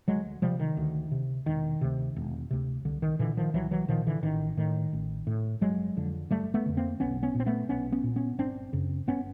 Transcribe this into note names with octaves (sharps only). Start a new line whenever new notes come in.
D2 F#3 G#3
C3 F3 G3
D#3
D2
C3
E1 D#3
D2 C3
E1
D2 C3
C2 D3
D#3
A#2 D3 E3
D#3 F3
C2 E3 F#3
E3 F#3
A#2 D#3 F3
D3 E3
A1 D#3
A2 D#3
A1
A2
G1 F#3 G#3
F2 D3
G1 G3 A3
A3 B3
F2 D3
A#3 C4
B1 B3 C#4
B3 C#4
A#2 C4
A3 B3
B1 B3 C#4
B3 C#4
A#2
B3 C#4
G1 C4 D4
F#2 C#3
G1 B3 C#4